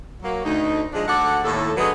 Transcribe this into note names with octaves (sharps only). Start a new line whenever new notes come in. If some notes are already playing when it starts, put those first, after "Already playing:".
F#3 A#3
D2 D#4
F3 G#3 D4
D2 F#4 A4 D5 F#5
D#2 A2 A4
D3 F#3 A3 G#4 B4 D#5